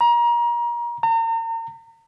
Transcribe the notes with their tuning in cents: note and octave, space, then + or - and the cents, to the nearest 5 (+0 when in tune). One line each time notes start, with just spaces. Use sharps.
A#5 +30
A#5 -40